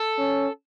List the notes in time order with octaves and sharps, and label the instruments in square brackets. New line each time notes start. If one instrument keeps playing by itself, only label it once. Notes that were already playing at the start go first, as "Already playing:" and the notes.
Already playing: [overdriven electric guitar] A4
[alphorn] C#4